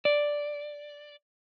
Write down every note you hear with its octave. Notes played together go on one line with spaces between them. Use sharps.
D5